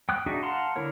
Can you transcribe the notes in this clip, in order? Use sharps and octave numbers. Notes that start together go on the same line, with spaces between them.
G5 D#6 F#6
D4 D#4 F#4 G#4 E5
F5 F#5 A5 A#5 C6
D3 E4 A#4 C#5